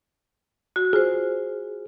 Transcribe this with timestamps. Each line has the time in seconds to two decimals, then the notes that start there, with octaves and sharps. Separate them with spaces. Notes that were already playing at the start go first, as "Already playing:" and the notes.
0.76 F#4
0.93 F4 G#4 C5